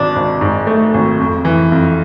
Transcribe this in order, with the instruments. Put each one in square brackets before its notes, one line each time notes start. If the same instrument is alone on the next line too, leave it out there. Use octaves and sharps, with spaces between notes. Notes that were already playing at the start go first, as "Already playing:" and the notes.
Already playing: [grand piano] G#1 G#2 [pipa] D4
[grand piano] G#1
G#2
A3
G#1
F2
E3
F2